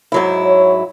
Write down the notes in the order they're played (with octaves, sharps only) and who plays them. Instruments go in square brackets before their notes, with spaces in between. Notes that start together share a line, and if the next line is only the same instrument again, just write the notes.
[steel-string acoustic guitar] G#2 F#3 E4
[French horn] C#5